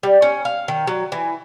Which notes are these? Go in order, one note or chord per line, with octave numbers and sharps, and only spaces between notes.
G3
C#4
F5
D#3
F#3
E3